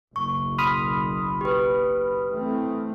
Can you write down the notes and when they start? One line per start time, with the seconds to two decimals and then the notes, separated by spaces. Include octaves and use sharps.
0.16 F#1 B1 C#6
0.58 B5 C6 D#6 F6
1.41 G4 B4
2.32 E3 A3 C4